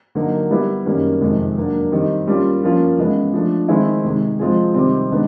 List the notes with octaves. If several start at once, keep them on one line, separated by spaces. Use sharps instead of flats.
D3 F#3 A#3 D#4
G3 B3 E4
F#2 D#3 G3 A#3 C#4
F2 C3 D#3 G#3
F#3 A#3 D4
D#3 G3 C4 D#4
G3 A#3 C#4 F4
F3 A#3 C#4 F4
C#3 E3 G#3 B3 E4
F3 A3 D4
D#3 G#3 C4 E4 G#4
C3 D#3 G#3
F3 G#3 C4 F4 G#4
C3 D#3 G3 C4
D#3 G#3 B3 D4